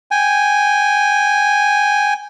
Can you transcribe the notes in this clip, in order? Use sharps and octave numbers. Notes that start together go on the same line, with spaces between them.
G5 G#5